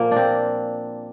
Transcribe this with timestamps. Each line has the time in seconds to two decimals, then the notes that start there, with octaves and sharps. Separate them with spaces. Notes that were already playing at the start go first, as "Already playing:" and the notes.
Already playing: A#2 F3 A#3
0.11 C4 D4